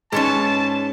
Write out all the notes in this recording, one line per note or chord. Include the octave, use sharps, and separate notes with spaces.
G#2 E3 C#4 C#5 D5 A5